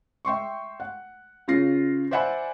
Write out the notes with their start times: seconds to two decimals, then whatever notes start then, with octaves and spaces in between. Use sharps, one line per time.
0.25 E5 G5 C6 C#6
0.80 F#5
1.48 C#3 F4 A#6 C7
2.11 C5 D5 E5 F#5 G#5 B5